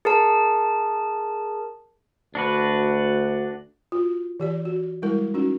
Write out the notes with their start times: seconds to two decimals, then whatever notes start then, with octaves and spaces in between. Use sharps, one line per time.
0.05 G#4 A#4 A5
2.35 D2 D4 F#4 B4
3.92 F4 F#4
4.40 E3 G4 D5
4.65 F#4
5.02 G3 G#3 E4 A#4
5.34 C#4 D#4 F#4